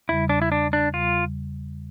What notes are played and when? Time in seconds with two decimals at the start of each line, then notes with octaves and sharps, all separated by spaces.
0.08 E2 C#3 G3 E4
0.29 D4
0.42 E4
0.52 D4
0.73 D4
0.94 E2 C#3 G3 F4